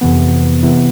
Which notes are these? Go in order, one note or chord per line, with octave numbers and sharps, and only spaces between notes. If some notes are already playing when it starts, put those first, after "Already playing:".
F2 C3 E3 B3
C3 E3 B3 E4